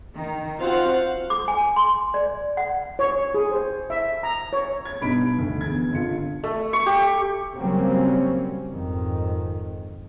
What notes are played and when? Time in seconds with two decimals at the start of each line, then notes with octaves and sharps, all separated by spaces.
0.16 D#3
0.60 C4 F4 F#4 C5 F5 F#5
1.30 D6
1.48 G#5
1.76 C6
2.14 D5
2.57 F#5
2.99 C#5
3.34 G#4
3.51 C5
3.90 E5
4.23 A#5
4.53 C#5
4.85 G#6
5.01 G2 B2 D#4 B5 B6 D7
5.39 D2
5.61 E2 G#6
5.91 G#1 D3 F4 C#7
6.44 A3
6.73 C#6
6.86 G4
7.55 C#3 F#3 G3 A#3 C4 C#4
8.70 F2 G#2 D#3